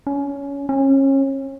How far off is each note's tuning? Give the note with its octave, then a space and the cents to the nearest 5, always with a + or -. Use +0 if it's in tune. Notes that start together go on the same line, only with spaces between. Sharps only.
C#4 +20
C#4 -30